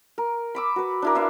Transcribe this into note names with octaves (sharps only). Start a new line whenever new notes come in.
A#4
B5 D6 E6
F#4 B4
D4 E4 A#4
E4 B4 E5 F5